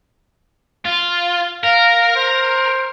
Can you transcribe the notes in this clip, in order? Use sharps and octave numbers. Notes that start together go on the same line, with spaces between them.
F4
A#4 F5
C5